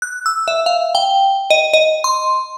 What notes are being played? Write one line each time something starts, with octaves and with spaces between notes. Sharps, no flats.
F#6
E6
E5
F5
G5
D#5
D#5
C6